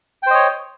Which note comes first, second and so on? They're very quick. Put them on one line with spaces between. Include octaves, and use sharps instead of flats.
G5 C5 D#5 C#5